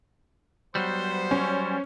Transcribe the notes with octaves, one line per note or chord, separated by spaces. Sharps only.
F#3 G3 B3 C5
C#4